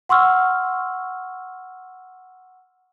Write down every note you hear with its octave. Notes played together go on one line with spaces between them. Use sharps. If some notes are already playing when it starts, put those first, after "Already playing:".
F#5 C6 C#6 E6 F6